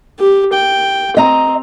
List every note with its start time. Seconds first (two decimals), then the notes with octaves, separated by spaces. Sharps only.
0.20 G4
0.54 G5
1.17 C4 D#5 A#5